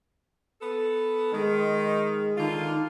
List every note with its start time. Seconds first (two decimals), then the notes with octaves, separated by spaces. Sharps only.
0.61 B3 A4
1.32 D#3 G#3
2.37 D3 D#3 F4